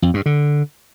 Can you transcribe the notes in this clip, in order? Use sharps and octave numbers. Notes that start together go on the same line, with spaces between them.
F2
G2
D3